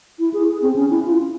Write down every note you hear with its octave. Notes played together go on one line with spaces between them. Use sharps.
E4
G#4
G#4
C4
C#4
E4
F4